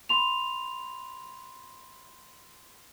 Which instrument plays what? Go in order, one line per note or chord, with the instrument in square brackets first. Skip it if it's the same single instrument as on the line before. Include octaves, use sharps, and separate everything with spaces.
[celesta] B5 C6 F7